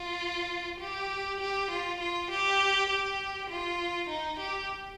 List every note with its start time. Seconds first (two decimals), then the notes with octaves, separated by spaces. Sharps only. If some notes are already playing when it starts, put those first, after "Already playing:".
Already playing: F4
0.80 G4
1.40 G4
1.70 F4
2.00 F4
2.30 G4
2.89 G4
3.49 F4
4.09 D#4
4.39 G4